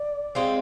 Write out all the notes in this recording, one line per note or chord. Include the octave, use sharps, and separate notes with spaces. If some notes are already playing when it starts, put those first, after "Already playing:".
Already playing: D5
G#3 C4 F4